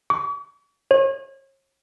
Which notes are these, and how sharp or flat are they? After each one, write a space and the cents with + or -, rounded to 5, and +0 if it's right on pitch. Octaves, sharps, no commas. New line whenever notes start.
C#6 +45
C#5 -40